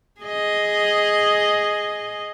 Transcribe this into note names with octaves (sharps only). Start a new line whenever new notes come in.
G#4 D#5